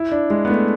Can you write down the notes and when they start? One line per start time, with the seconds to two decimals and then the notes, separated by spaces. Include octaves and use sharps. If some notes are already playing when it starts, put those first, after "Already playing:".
Already playing: E4
0.12 D4
0.30 G#3
0.45 B3
0.50 A3